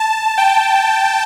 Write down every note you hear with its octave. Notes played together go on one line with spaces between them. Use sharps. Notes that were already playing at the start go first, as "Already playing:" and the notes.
Already playing: A5
G5